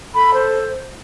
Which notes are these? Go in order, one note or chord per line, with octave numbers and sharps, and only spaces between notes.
A4 B5
C5